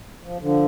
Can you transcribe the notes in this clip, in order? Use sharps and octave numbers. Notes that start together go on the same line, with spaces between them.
F3
D3 F3